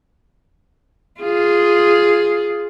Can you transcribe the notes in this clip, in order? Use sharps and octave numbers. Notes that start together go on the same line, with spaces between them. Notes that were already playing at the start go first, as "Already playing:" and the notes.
F4 G#4